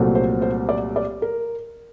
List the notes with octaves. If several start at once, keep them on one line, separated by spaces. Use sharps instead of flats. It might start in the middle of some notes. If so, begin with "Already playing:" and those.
Already playing: C2 A#2 F#3 A3 C4
C5
C5
D5
D5
A#4